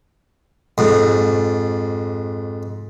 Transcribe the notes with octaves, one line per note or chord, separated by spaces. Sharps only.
F2 G#2